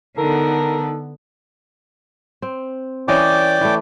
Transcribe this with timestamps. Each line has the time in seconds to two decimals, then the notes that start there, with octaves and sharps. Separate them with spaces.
0.18 D3 B3 D#4 A4 A#4
2.42 C4
3.08 E3 C#4 D5 D#5 G5 D6
3.61 E3 A3